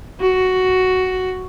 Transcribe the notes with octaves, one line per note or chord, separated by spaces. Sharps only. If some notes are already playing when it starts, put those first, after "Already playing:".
F#4